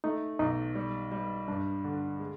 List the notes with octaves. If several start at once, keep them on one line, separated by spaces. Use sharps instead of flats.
A3 D#4
B1 D#4
G3
G3
G2 D4
D3
G#3